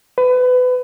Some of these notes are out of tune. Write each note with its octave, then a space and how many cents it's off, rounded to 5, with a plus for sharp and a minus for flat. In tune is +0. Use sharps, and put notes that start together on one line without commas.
B4 +25